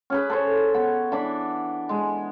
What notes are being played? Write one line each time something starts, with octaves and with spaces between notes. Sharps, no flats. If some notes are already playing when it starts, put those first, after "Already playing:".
C#4 G#4 B4
A4 C5 C#5
B3
E3 D4 D5 B5
G#3